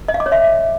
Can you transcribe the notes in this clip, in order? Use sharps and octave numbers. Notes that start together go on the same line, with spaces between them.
D#5
F5
D6
C#5
E5